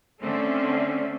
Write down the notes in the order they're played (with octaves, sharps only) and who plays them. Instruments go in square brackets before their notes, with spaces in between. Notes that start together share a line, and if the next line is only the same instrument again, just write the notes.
[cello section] D3 A3 C4 C#4